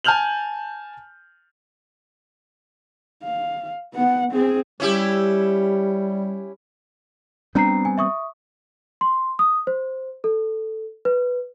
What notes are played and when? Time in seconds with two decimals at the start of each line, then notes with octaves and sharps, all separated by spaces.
0.04 G#5 A5 F6 G6 F7 F#7
3.23 F5
3.94 B3 F#5
4.31 C4 G#4
4.80 G3 C#4 E4 G4
7.55 G3 B3 C4 D4 A#5 C7
7.85 G#5
7.98 E5 C#6 D#6
9.01 C6
9.39 D#6
9.67 C5
10.24 A4
11.05 B4